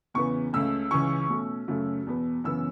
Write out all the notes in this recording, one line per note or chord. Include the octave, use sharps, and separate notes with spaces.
E2 C#3 E3 B3 C#6
C#2 C#3 A3 C#4 E6
C#2 C#3 E3 C#4 C#6
B2 A3 C#4
F#2 C#3 F#3 A3
E2 B2 B3
F#2 C#3 E3 B3 E6